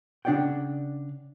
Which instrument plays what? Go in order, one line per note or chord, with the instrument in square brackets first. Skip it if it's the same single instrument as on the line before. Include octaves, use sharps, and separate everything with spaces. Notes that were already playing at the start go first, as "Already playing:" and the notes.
[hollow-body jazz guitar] C#3 D4 G#4 D5 F#5 G5